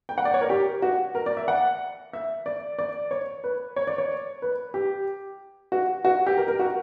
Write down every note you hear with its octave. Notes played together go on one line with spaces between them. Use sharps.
G5
F#5
D5
C#5
A#4
G4
F#4
A#4
D5
E5
F#5
E5
D5
D5
C#5
B4
C#5
D5
C#5
B4
G4
F#4
F#4
G4
A#4
A#4
F#4